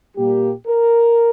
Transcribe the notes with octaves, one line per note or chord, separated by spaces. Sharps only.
A#2 G3 A#3 G4
A#4